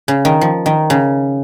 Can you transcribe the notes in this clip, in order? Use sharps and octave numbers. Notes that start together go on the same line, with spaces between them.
C#3
D#3
F3
D#3
C#3